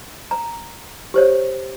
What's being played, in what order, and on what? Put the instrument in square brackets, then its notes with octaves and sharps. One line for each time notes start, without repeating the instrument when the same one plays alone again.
[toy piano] A#5
G4 C5 C#5